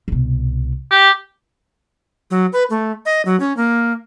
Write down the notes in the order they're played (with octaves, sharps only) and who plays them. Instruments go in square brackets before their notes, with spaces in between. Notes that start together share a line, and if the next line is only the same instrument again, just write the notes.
[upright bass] C2 B2
[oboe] G4
[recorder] F#3
B4
A3
D#5
F#3
C#4
A#3